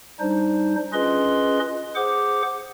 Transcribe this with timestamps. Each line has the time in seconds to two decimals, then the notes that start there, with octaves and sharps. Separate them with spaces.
0.20 G3 D4 D#4 C5
0.93 C#4 F4 G#4 B4 D#5 C6
1.96 G#4 C5 F#5 D6